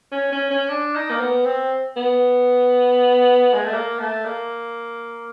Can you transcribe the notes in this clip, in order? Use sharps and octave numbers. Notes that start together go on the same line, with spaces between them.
C#4
C#4
C#4
D4
D#4
A#3
B3
C4
B3
G#3
A3
A#3
A3
A#3